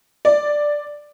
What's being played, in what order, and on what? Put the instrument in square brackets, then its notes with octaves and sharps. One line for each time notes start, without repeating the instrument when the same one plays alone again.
[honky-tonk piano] D5